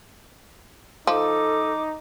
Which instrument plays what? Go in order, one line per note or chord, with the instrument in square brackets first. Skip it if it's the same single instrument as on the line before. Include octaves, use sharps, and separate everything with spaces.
[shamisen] F3 [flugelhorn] D#4 [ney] A4 [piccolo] D6